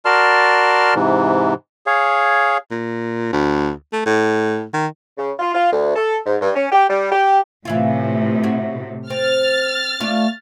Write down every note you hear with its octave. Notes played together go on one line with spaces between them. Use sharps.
F#4 A#4 D5 A5 C6 F6
G#2 C3 E3
G#4 C#5 F5
A#2
D2
A3
A2
D#3
C#3
F4
F4
D2
A4
G#2
G2
C#4
G4
G3
G4
A2 C3 E3 E4 F4
E4 F#4
C4 F6 A6
A3 D4 F4